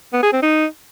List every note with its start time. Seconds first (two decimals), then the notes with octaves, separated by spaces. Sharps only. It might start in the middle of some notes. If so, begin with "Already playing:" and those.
0.13 B3
0.23 G#4
0.32 C4
0.42 D#4